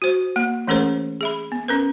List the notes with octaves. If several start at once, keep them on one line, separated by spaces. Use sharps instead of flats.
F#4 C5
A#3
E3 A3 C#4 G#4 A#4 C5
G#4 E5 B5
B3
C#4 A#4 B4